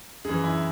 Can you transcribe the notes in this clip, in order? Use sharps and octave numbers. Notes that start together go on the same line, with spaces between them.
F#2 E3 G#4
E4